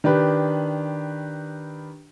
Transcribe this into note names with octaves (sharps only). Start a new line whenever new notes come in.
D#3 D4 G4 B4